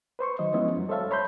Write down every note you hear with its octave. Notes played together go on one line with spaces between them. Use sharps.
B4 C5 C6 C#6
D#3 F#3 D#5
F3 G#3 B3 C#4 E4 D#5
F#2 F#3
A4 C5 C#5 E5 F5 A5
C#5 B5 C6 G6